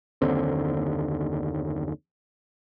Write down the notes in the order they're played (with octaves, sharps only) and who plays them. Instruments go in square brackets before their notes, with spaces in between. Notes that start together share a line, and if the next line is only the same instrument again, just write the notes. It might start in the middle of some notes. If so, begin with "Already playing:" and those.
[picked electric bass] F#1 D#2 D3 C4